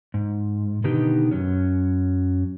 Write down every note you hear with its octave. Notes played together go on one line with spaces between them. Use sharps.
G#2
B2 D3 D#3 B3 D#4 G4
F#2 F#3 C#4